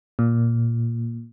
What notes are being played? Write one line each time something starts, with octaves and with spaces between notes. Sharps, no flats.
A#2